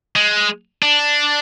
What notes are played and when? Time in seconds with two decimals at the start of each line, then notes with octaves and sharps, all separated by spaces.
0.16 G#3
0.82 D4